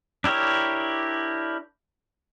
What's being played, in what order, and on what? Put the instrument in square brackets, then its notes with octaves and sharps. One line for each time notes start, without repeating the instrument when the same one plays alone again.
[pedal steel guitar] D4 E4 G4 A#4 C#5